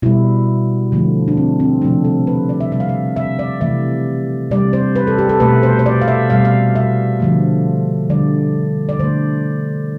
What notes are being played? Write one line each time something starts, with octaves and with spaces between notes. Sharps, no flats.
B2 G3 E4
D3 F3 A3
D4
C4
C4
C3 F3 A3 D4
A4
B4
D5
E5
C3 G3 E5
F5
E5
E5
D5
C3 E3 A3 E5
C3 G3 D5
C5
B4
A4
G4
A4
B2 A3 B4
C5
C5
D5
F5
E5
B2 G3 F5
F5
E5
D3 F3 A3
D3 G3 D5
D5
D3 A3 C5